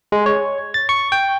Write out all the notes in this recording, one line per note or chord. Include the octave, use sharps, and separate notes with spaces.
G#3
C#5
A6
C#6
G5